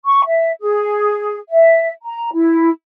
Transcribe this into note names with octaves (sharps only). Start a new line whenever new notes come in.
C#6
E5
G#4
E5
A#5
E4